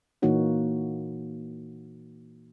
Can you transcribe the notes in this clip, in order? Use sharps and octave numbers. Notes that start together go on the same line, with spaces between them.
A#2 E3 A#3 D#4 F#4 C#5